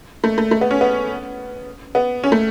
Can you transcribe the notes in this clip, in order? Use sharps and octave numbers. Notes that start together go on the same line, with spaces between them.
A3
A3
A3
B3
C#4
B3
B3
C#4
A3